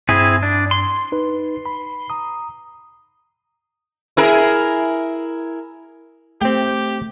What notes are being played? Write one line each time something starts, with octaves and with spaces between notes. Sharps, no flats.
G2 C4 E4 G#4
D4
C6
D#4 B4
B5
A#5 D#6
E4 G#4 A#4
A3 C4 G4 G5